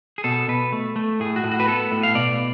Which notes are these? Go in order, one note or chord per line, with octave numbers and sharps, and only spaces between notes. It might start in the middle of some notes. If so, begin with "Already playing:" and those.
G#4
B2 A4
B2 B4
A3
A3
A2 G#4
F#4
A2
F#4
B4
B3 A4
A2
F5
B2 D5